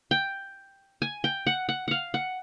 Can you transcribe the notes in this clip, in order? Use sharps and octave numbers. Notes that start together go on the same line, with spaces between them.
G5
G#5
G5
F#5
F#5
F5 F#5
F#5